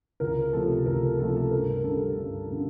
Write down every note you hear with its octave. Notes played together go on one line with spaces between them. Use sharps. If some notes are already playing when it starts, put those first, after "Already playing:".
C#2 A#4
C3 F3 A3 A4
C#2 A#4
C3 F3 A3 A4
A4
G2 A#4
A#4
D3 G3 A4
G2
D3 G3